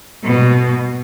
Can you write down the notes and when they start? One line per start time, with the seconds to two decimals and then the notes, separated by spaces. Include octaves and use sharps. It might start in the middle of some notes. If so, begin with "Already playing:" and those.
0.24 B2